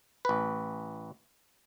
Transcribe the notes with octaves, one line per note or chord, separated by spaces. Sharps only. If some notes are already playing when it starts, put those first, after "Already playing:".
A1 B4